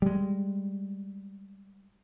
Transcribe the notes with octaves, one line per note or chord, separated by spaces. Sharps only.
G3 G#3